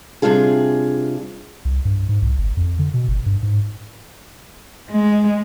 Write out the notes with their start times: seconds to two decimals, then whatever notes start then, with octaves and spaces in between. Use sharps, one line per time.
0.22 C3 F#3 G3 D4 F4 G#4
1.65 C2
1.85 G2
2.09 G#2
2.22 C2
2.38 G1
2.57 F2
2.79 D3
2.94 B2
3.08 G1
3.26 G2
3.43 G#2
4.91 G#3